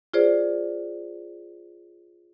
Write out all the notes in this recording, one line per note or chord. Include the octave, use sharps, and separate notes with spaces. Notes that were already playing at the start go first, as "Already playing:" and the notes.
F4 G#4 C5 D5